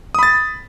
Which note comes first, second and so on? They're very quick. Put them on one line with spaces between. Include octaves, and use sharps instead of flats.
D#6 B5 A6